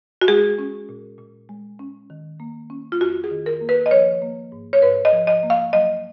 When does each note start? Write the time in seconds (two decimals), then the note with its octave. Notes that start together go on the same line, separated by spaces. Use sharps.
0.21 F#4
0.28 G#3 G#4
0.58 C#4
0.89 A#2
1.18 A#2
1.49 G#3
1.79 C#4
2.10 D#3
2.40 A#3
2.70 C#4
2.92 F4
3.01 F2 F#4
3.24 G#4
3.31 D#3
3.46 A#4
3.61 A#3
3.69 B4
3.86 D#5
3.91 F3 C#5
4.22 A#3
4.52 G#2
4.73 C#5
4.82 G#2 B4
5.05 D#5
5.13 F3
5.27 D#5
5.43 A#3
5.50 F5
5.73 F#3 D#5